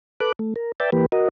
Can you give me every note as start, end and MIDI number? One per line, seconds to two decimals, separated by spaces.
0.20 0.32 69
0.20 0.32 71
0.20 0.32 86
0.20 0.32 90
0.39 0.54 57
0.56 0.72 70
0.80 0.90 71
0.80 0.90 74
0.80 0.90 76
0.80 0.90 79
0.80 0.90 81
0.92 1.06 52
0.92 1.06 58
0.92 1.06 67
0.92 1.06 71
1.12 1.29 66
1.12 1.29 70
1.12 1.29 75